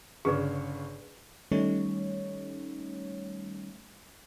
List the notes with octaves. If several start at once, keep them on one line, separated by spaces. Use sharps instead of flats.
G1 C#3 G#4 B4 D5 C#6
D#3 G3 A3 C#4 D#4 C#5